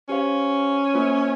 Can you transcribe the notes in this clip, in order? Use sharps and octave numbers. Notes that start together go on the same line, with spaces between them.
C#4 G4 C5 F5
A#3 F4 C5